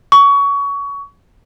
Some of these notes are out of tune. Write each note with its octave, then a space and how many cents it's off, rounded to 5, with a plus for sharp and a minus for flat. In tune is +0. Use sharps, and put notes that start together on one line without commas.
C#6 +25